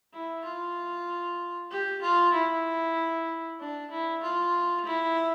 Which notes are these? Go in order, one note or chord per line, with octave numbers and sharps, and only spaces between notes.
E4
F4
G4
F4
E4
D4
E4
F4
E4